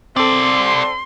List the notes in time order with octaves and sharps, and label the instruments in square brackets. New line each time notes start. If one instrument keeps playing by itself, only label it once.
[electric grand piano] C4 A4 [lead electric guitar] C5 D5 [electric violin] C6